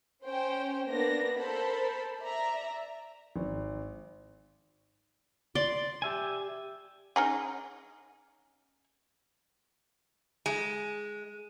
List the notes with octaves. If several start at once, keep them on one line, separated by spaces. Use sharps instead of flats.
C#4 C5 G5
A#3 B3 D4 A#6
A4 A#4 C5 A5 B5
D5 E5 A#5
G#1
D5 C6
G4 E5 G#5
C#4 D#4 G#4
G#3